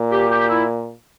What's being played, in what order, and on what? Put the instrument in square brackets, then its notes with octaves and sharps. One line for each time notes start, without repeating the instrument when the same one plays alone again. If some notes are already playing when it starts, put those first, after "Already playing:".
Already playing: [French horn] A#2
[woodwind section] G4
G4
E4